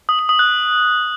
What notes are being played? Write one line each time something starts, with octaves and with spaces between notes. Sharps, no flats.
D#6
D#6
D#6
F#6